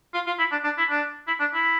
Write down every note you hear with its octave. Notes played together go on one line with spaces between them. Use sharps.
F4
F4
E4
D4
D4
E4
D4
E4
D4
E4